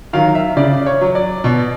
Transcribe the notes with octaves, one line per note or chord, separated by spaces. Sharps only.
D#3 F#3 F5
E5
C#3 D5
C#5
F#3
D5
B2